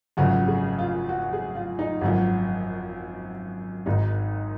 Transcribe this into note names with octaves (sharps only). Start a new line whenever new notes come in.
G#1 F#2 C#3 F3 F#4
G#4
F4
F#4
F#4
G#4
F4
D#4
G#1 F#2 F3 F#4
G#1 G#2 D#3 D#4